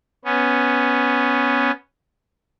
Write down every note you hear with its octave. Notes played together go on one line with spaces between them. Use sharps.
B3 C#4